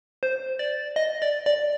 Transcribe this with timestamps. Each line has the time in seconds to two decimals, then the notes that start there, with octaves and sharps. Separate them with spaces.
0.23 C5
0.59 D5
0.96 D#5
1.22 D5
1.46 D5